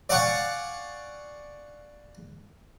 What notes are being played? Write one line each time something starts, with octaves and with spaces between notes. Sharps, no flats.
D5 F5 F#5 G#5 C#6